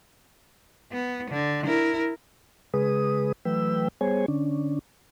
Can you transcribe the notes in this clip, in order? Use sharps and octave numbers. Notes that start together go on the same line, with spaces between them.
B3
D3
E4 A#4
C#3 G#3 G#4 B4 D#6
E3 F#3 A3 B4 G5 E6
G3 B3 G#4 C5 C#5 G#5
D3 C#4 D4